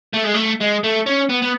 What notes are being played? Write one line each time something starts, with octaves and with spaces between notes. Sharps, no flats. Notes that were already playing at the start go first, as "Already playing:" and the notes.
A3
G#3
A3
G#3
A3
C#4
B3
B3